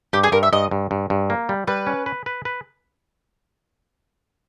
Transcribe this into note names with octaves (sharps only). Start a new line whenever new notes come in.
G2 G4
G#4
G2 A#4
E5
G2 D#5
G2
G2
G2
A#3
G3
G3 B4
C#4
B4
B4
B4